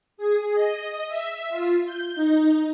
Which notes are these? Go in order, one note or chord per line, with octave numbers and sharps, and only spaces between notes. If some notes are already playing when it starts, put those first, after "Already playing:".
G#4
D#5
E5
F4
G6
D#4